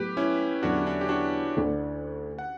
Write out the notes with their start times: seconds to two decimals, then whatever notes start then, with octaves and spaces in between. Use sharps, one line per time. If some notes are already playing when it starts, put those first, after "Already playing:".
Already playing: A2 F#3 B3 G4 B4
0.17 C#4 E4
0.62 E2 D3 F#3 D4 F#4
0.87 D4
1.01 G4
1.09 D4 F#4
1.55 D2 D3 A3 D4
2.39 F#5